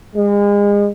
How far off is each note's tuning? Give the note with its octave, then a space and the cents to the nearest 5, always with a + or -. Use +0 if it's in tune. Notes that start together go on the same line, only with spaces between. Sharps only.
G#3 -35